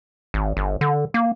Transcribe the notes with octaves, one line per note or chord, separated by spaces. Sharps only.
G#1
G1
D3
A#3